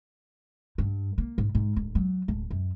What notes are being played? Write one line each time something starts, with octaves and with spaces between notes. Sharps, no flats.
G2
A#3
G#2
G#2
D1
F#3
D1
F#2